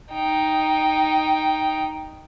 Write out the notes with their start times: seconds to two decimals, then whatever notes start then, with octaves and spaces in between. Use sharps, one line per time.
0.12 D#4 G5